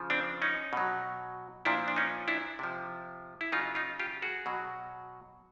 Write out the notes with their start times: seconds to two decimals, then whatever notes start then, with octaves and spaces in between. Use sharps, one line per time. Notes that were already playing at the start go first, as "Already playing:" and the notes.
Already playing: C#3 F3
0.10 C4 D4
0.42 C#4 D#4
0.73 B2 F#3
1.65 A#2 F3 D4 E4
1.88 D4
1.96 C#4 D#4
2.28 D4 E4
2.59 C3 F3
3.41 E4
3.52 C#3 F#3 D#4 F4
3.75 D#4 F4
3.99 F4 G4
4.22 F#4 G#4
4.46 B2 F#3